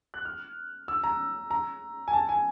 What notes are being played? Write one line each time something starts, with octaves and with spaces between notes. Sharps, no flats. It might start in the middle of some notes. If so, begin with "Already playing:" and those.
F#6
F6
E6
A#5
A#5
G#5
A5
G#5